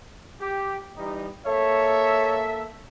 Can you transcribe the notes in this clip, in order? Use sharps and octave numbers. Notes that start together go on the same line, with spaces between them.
G4
E3 G3 D#4
A#3 A4 C#5 E5